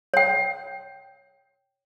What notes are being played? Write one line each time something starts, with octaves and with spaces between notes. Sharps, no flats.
C#5 G5